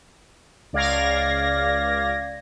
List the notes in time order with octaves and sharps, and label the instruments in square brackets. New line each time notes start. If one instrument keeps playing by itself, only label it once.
[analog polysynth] C#2 D5 F5 G#6 A#6